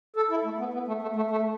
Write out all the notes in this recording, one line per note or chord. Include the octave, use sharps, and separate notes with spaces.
A4
E4
A3
B3
B3
A3
A3
A3
A3